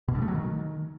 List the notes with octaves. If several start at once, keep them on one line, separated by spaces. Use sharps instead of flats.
B2
G2
A3
F#3
D#3